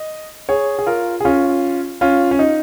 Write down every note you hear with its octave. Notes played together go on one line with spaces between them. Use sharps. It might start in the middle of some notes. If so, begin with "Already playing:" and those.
Already playing: D#5
G#4 C#5
G#4
F4 A#4
G#4
C#4 F4
C#4 F4
C#4
D#4